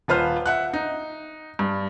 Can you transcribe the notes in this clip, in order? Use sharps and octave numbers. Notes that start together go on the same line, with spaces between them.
D#1 F4 B4 C5 F6
E5 F#5 F#6
D#4
G2